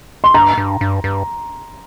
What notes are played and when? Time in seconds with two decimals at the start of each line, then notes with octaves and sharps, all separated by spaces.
0.24 C6
0.34 G2 A#5
0.58 G2
0.81 G2
1.04 G2